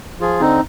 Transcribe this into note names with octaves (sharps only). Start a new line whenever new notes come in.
F3 F4 G#4
D3 C4 D#4